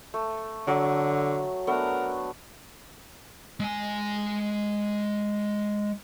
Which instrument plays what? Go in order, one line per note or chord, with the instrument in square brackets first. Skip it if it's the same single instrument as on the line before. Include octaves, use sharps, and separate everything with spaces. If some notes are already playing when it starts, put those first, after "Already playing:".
[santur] A3
[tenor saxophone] D3 [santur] F#3
[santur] A3 B3 D4 [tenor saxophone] A#4
[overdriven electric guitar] G#3 G#5